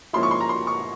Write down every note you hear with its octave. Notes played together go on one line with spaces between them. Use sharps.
G#2 F3 A#3 C#4 E4 C6
C#6
C6
A#5
C6
C#6